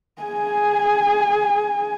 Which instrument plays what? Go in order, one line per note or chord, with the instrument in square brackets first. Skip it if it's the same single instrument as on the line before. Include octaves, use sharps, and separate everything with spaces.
[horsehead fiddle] G#4 G#5